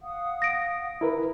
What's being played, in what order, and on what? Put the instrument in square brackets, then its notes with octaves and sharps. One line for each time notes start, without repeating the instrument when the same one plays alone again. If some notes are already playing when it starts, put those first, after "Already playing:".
[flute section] F5 F#5 D#6
[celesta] A#6 D7
[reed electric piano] E4 A#4 B4